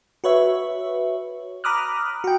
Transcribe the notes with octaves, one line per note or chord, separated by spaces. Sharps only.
F#4 B4 C#5 E5
A#5 B5 D6 D#6 F6 F#6
F#4 G5